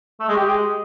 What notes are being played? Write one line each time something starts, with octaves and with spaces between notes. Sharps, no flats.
A3
G#3
G4
G#3